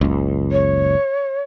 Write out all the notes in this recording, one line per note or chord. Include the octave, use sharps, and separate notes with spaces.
F#1 C#2
C#5